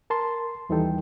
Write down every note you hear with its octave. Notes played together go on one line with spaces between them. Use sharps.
A#4 A5 C6
D#2 E3 G3 D#4 A4 G5